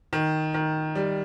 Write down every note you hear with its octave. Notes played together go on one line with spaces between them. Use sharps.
D#3
D#3
G3